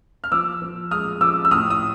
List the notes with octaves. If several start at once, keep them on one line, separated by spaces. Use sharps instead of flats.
F6
F3 D6 E6
F3
G#3 D#6 F6
F3 D6 E6
E6
A2 D#6 F6
D#6